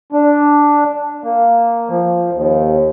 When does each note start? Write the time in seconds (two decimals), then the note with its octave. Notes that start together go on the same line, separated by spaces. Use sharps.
0.13 D4
1.24 A#3
1.89 F3
2.33 D#2